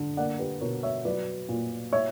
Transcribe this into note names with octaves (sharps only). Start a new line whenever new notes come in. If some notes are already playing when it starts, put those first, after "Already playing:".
Already playing: D3
A#3 D5 F#5
G4 B4
B2 A#4 C#5
C#5 E5
F#3 B4 D5
A#2
C#5 E5